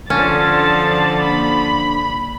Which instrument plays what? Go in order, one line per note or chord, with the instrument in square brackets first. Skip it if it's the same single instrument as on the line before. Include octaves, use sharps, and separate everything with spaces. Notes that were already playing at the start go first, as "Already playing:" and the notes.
[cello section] D3 F3 [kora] C#4 [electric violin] A5 A6
[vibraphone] A#3 D4 [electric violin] B5